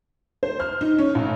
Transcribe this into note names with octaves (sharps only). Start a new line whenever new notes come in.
C5
F6
D#4
C#4
A1